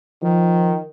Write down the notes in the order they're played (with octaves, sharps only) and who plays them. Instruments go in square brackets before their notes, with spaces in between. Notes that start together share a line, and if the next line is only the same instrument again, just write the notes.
[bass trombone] D#3 [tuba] F3